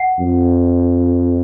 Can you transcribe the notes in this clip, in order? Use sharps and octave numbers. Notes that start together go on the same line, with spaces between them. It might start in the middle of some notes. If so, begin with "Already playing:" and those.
Already playing: F#5
F2